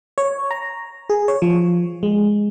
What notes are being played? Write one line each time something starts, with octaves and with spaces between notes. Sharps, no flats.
C#5
A#5
G#4
C#5
F3
G#3